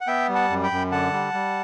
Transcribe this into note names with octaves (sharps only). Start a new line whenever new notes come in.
F#5
B3 E5 G5
G3
F#5 A5
F#2
G5 B5
F#2
D3 F#5 A5
G3
G3